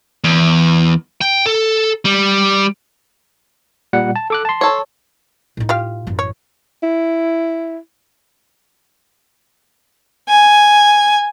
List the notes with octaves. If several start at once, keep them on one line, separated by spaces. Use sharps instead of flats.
E2
G5
A4
G3
A#2 G3 F#5
A5
A4 D6 F#6
A5 C6
A4 C#5
A2 D#4
F4 G4 F5
A1 F#2
C#5
E4
G#5